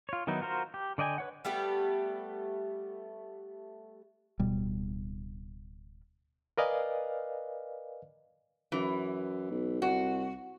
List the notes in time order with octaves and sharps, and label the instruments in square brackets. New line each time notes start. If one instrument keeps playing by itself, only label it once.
[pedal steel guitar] F4 C#5
D#3 F#3 B3 D#4 E4
F4 F#4 A#4 C5
G4
D3 D5 D#5 G5 G#5
B4 C#5 F#5
[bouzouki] G3 A3 B3 G4
[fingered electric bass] D1 B2 G3
[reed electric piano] A#4 B4 D5 D#5 F5 G#5
[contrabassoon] F#2 [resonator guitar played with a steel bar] E3
[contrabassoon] B1
[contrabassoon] C2 [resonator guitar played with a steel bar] F#4